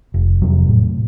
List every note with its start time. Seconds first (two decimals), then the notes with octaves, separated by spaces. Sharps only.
0.14 F1
0.42 F2 C3 F#3
0.69 A2